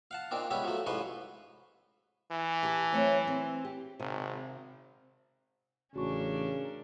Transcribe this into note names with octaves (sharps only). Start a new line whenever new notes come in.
F5 F#5 A5
A#2 D#3 C4 D4
C#2 G3 B3 C#4 C#5 E5
F3 F#3 A3
A1 G#2 F3 B4 C#5 C6
E3
G4 A5
F#3 A3 C4
C4
G4
G#1 C3
A1 C#3 C#4 D4 F#4 A#4 C#6